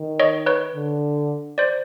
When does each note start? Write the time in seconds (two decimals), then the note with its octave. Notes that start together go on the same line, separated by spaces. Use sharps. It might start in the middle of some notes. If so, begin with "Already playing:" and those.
Already playing: D#3
0.20 C#5 D#5
0.46 B4 C#5
0.75 D3
1.58 C5 D5